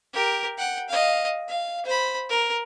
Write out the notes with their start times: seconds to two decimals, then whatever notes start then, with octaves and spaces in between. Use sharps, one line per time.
0.13 G4 A#4
0.58 F#5 G5
0.89 D#5 F5
1.48 F5
1.86 C5 B5
2.29 A#4